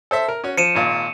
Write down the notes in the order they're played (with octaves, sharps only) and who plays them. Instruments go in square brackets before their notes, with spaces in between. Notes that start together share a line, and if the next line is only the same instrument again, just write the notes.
[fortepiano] A4 C5 E5
A#4
C#4 F#4 C#5
[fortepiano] F3 [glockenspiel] C#7 D#7 E7
[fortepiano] G#1 A#2 F4